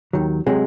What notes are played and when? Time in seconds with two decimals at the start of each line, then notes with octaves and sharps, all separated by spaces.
0.13 D#2 D#3 F#3
0.46 C3 F#3 G#3